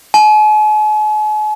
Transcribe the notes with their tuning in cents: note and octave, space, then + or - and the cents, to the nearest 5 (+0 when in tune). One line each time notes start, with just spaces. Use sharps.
G#5 +45